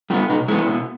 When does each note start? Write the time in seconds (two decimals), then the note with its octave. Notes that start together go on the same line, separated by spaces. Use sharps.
0.10 G3 F4
0.14 B3
0.29 B2 D#4
0.48 G#3 B3 E4
0.68 B2